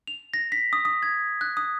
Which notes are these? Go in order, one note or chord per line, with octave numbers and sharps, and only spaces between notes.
F7
A#6
B6
D#6
D#6
G#6
F#6
D#6